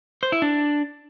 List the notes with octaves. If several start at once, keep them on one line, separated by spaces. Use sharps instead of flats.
C5
E4
D4